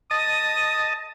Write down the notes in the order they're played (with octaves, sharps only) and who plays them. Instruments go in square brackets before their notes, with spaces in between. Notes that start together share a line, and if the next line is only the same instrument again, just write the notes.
[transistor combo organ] D#5 A5 [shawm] D#6